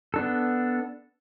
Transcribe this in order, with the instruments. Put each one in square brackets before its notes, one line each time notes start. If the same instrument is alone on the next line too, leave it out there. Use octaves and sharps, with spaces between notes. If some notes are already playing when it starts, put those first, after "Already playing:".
[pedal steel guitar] B3 D4 A4